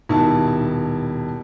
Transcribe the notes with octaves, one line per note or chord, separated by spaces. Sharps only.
D#1 B2 D#3 E4 A5